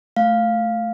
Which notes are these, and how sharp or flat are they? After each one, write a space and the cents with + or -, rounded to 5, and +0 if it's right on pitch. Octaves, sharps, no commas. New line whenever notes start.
A3 -5 F5 +0